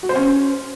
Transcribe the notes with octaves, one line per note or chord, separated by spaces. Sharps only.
F#4
C5
C#4